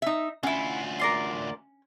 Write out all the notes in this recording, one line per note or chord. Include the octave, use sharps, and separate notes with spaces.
D#4 E5
D2 C#4 E4 F4 F#5
A#4 D5 C6